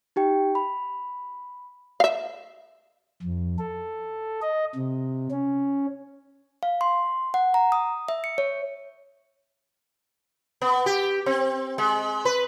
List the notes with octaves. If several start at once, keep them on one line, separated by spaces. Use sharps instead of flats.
D#4 G4 G5
B5
E5 F5
F2
A4
D#5
C3
C#4
F5
C6
F#5
A#5
D#6
E5
C#7
C#5
B3
G4
C4
G#3
B4